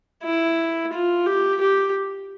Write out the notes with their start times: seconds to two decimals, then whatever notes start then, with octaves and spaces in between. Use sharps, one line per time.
0.24 E4
0.93 F4
1.26 G4
1.61 G4